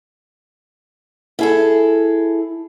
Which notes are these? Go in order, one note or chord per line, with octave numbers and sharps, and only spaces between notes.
E4 G#4 A4